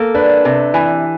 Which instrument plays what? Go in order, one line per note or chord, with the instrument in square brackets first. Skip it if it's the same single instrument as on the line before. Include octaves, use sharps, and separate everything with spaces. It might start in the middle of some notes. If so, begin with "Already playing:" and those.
Already playing: [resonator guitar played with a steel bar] A#3 [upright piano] A4
[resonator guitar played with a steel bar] D4 [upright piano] B4
[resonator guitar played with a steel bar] C3
E3